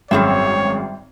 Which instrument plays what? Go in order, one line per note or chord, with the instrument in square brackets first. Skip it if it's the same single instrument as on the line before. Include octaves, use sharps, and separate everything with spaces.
[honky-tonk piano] G#1 F#2 G#4 [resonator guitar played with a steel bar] G3 C4 E5 [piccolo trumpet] C#5